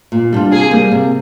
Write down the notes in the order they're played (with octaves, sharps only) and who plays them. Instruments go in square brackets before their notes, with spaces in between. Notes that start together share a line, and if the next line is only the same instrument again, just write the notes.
[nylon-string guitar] A#2
G3 D4 F4
[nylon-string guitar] C3 [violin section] G#4
[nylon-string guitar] G3 A#3
C3